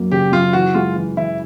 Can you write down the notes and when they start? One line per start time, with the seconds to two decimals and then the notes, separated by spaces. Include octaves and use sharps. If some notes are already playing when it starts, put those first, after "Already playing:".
Already playing: F#2 F#3 A#3
0.11 C#3 G4
0.32 F#2 F4
0.53 E3 F#4
0.74 G#3 F4
0.96 E3
1.17 E3 E4